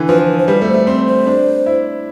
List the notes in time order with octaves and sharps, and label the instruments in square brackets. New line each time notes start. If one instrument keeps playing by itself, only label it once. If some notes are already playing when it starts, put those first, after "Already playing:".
Already playing: [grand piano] D3 E3
[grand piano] F3 [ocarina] B4
[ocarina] C5
B4
C5
[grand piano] G3 [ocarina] B4
[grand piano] A3
[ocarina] C5
[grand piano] A3
[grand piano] C4 [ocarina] C5
[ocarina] C5
[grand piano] D4
E4